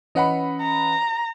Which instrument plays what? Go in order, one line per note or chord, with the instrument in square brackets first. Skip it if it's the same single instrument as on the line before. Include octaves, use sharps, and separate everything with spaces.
[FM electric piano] E3 C#4 B4 [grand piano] D#5 F#5 B5
[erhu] A#5